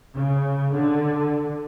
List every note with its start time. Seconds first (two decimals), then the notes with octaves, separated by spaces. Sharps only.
0.14 C#3
0.73 D3